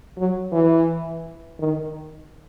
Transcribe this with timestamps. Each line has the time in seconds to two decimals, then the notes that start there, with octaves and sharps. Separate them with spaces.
0.18 F#3
0.52 E3
1.59 D#3